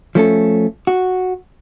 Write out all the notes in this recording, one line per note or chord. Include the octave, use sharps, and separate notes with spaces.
F3 A3 C#4 A4
F#4